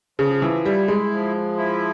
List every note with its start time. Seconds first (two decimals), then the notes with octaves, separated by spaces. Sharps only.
0.19 C#3 F3
0.42 E3
0.65 G3 E4
0.88 G#3
1.11 F3
1.57 E4